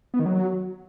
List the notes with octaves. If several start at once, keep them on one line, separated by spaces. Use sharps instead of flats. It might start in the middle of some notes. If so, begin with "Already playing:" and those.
B3
D#3
F#3